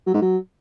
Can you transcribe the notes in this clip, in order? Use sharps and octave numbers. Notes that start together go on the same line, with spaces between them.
F#3
G#2
F#3